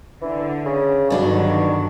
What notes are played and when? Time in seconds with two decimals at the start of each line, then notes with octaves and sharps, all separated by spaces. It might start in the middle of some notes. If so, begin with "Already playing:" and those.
0.22 D3 E3
0.66 C#3
1.10 G2 B2 D3 D#3 F#3 D4 F#4